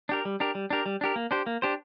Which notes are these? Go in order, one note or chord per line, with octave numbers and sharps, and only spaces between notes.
D4 G4 A#4
G3
D4 G4 A#4
G3
D4 G4 A#4
G3
D4 G4 A#4
A#3
D4 G4 C5
A#3
D4 G4 C5